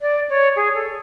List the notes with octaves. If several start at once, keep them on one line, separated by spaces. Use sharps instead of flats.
D5
C#5
G#4
A4